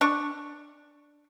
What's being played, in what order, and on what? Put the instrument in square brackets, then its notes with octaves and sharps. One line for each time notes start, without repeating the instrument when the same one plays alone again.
[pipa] D4 C#6